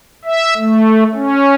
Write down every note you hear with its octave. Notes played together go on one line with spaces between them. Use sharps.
E5
A3
C#4